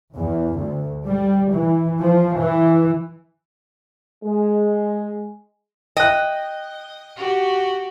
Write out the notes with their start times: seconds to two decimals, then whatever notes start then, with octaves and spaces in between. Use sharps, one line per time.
0.15 E2
0.58 D2
1.07 G3
1.52 E3
2.03 F3
2.39 E3
4.25 G#3
5.97 D#5 G5 F#6
7.16 F#4 G4